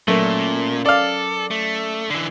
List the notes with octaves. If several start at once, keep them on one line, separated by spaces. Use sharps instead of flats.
A#2 F#3 A3 C#4 A#4
A4 D5 F5
A3
D3 E3